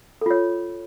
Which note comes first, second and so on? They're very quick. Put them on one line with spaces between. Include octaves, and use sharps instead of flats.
A4 F4 C#5